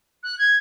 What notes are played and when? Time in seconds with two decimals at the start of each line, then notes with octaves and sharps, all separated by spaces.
0.23 F#6
0.39 G#6